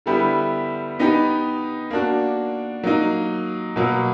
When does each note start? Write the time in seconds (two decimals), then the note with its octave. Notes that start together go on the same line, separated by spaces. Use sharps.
0.06 D3 G3 B3 E4 G4
0.99 B3 D#4 G4
1.91 A#3 D4 F#4
2.83 F#3 A#3 D#4
3.76 B2 F#3 A#3